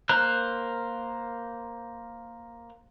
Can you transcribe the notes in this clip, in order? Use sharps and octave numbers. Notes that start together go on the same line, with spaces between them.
A#3 A#4 C5 A#5 F#6